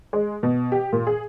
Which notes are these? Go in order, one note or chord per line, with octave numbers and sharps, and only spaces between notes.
G#3
B2
G4
A#2
G#4